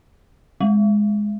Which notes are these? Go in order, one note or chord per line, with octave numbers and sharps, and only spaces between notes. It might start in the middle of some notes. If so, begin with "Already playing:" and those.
G#3